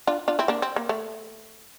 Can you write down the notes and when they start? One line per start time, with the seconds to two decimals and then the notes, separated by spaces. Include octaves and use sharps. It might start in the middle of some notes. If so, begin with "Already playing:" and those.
0.07 D4 F4
0.28 D4 F4
0.39 C4 E4
0.48 A#3 D4
0.62 C4
0.76 A#3
0.89 A3